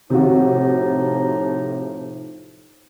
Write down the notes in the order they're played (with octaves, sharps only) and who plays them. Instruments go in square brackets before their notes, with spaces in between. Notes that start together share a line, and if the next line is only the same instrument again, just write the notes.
[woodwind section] A2 F3 D#4 [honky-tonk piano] C3 F#4